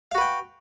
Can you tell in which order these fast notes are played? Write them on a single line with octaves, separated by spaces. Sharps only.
F5 F#4 B4 G5